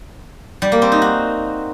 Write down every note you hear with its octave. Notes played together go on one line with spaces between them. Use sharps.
G3
A#3
C4
D#4
F#4